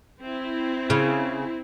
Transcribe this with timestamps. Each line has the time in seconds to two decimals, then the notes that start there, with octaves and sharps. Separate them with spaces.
0.20 C4 E4
0.90 C#3